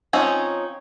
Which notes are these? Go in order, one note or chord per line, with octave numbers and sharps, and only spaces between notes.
F3 C4 C#4 D#4